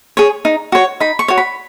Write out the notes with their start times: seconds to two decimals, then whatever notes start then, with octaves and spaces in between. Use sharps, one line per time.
0.17 G#4 C#5
0.45 D#4
0.72 F#4 C#5
1.00 D#4 B5
1.19 C#6
1.28 F#4 C#5
1.38 B5